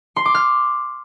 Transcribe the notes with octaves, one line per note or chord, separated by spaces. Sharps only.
C6
D6
F6